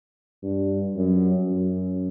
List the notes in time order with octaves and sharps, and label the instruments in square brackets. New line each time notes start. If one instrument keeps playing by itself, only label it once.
[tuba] G2
F#2
F#2